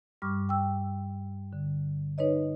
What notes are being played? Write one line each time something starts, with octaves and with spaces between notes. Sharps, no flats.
G2 G3 C#6 D6 F6
G5 E6
D3
D#4 B4 C#5 D#5